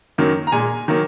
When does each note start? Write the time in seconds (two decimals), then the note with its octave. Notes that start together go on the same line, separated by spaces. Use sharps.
0.18 F#2 D#3 F#3 A#3
0.47 A#5
0.52 A#2 G#3 G#5
0.88 D#3 F#3 A#3